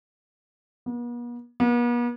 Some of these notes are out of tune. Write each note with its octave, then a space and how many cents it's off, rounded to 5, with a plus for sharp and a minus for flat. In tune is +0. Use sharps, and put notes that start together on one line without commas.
B3 -45
B3 -45